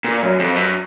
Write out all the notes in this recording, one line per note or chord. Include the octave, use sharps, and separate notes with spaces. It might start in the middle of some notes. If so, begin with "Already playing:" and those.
A#2
F#2
F2
F#2